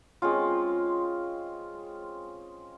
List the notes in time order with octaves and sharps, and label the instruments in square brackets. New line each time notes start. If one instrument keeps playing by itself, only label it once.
[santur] G#3 C4 C#4 F4